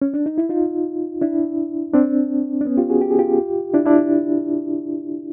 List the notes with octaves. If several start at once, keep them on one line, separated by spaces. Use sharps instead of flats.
C#4
D4
D#4
E4
D#4 F4
D4 E4
C4 D4
D4
B3 C#4
F4 G4
F#4 G#4
G4
G#4
F4 G4
D4 E4
D4 E4